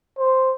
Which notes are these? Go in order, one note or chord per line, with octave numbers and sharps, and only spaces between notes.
C5